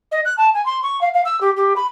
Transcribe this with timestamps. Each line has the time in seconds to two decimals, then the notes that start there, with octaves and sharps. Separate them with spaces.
0.12 D#5
0.25 F#6
0.37 A5
0.54 G#5
0.66 C6
0.83 C#6
1.01 F5
1.14 F5
1.25 E6
1.41 G4
1.57 G4
1.76 B5